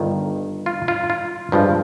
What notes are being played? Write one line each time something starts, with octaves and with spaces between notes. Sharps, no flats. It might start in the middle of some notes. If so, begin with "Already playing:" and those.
Already playing: G1 G2 D#3
F4
F4
F4
G2 F3 G#3